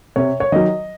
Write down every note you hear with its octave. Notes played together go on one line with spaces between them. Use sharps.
C3 C#5
C#5
D#3 F#3 D#5